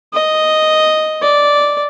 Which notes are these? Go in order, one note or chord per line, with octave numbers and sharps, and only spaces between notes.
D#5
D5